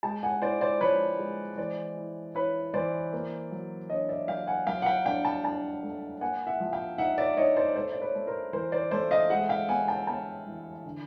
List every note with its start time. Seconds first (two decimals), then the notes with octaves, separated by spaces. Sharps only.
0.03 G#3 G5 A5
0.23 F#5 G#5
0.42 E4 C5 D5
0.61 C5 D5
0.81 F3 B4 C#5
1.19 G#3
1.58 E3 C5 D5
1.97 E4
2.35 E4 B4 C#5
2.74 E3 C5 D5
3.13 A#3
3.51 F#3
3.90 D4 C#5 D#5
4.09 D5 E5
4.28 F#3 F5 G5
4.47 F#5 G#5
4.66 F#3 F5 G5
4.82 F#5
4.86 F5 G5
5.06 D4 F5 G5
5.25 G5 A5
5.44 D4 G5 A5
5.83 A3
6.21 A#3 F#5 G#5
6.47 E5 F#5
6.60 F3
6.73 F5 G5
6.98 D#4 E5 F#5
7.18 D5 E5
7.37 D#4 C#5 D#5
7.57 C5 D5
7.75 A3 C5 D5
7.93 D5
8.02 B4 C#5
8.15 A3
8.27 A#4 C5
8.53 E3 A#4 C5
8.72 C5 D5
8.91 A3 C5 D5
9.11 D#5 F5
9.30 G#3 E5 F#5
9.49 F5 G5
9.68 B3 F#5 G#5
9.88 G5 A5
10.07 B3 G5 A5
10.47 E3
10.84 D3